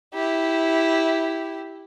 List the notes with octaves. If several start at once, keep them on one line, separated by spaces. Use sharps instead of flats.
E4 G4